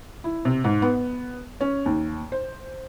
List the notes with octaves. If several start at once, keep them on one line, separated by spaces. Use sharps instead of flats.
E4
C3
G#2
B3
C#4
D#2
C5